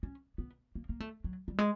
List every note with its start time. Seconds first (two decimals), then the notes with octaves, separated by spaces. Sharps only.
0.03 C#4
0.38 B3
0.75 A#3
0.89 A#3
1.00 A3
1.24 F#3
1.48 G3
1.58 G#3